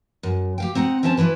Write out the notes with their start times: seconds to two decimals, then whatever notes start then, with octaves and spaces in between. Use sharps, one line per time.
0.23 F#2
0.58 G4 F5 G5
0.75 C4 D#4 F#5
1.03 C4 C#4 E4 F4 C5 A5
1.17 E3 E4 F4 B4